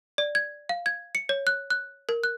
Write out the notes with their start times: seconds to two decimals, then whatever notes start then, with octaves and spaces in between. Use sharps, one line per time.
0.18 D5
0.35 G#6
0.69 F5
0.86 G#6
1.15 C#7
1.29 C#5
1.47 F#6
1.70 F#6
2.09 A#4
2.24 F#6